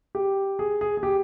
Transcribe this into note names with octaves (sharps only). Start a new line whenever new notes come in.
G4
G#4
G#4
G#4
G4